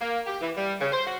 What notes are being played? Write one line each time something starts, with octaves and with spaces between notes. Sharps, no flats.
A#3
G4
E3
G3
C#3
C5
F#4